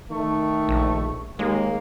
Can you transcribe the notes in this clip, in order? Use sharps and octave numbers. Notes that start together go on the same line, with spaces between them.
D#3 A3 C#6
A#1
D#2 G#3 A#3